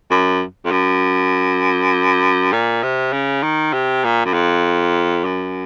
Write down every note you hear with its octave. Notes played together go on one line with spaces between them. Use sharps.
F#2
F2
F#2
A#2
C3
C#3
D#3
C3
A#2
F#2
F2
F#2